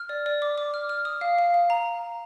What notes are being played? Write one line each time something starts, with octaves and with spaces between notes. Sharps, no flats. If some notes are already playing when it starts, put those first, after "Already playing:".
Already playing: F6
D5
D5
D6
D6
F6
F6
D#6
F5
F5
F5
A#5